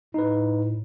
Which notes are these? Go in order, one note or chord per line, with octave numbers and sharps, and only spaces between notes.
A2 D#4 B4